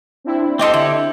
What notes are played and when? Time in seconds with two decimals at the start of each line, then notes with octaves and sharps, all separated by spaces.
0.24 C4 D4 E4
0.59 C4 G4 A4 D5 D#5 C6
0.74 D3 E4